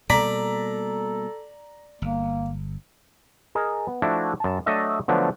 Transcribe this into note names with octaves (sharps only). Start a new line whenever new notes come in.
B2 G3 A#3 A4 D5 A#5 B6
G1 A#3
G#4 A#4 D#5
B3
F3 A3 D4 E4 F#4
F#2 A5
F#3 A3 D4 A4 D#5 E5
D3 F3 F#3 A3 B3 D4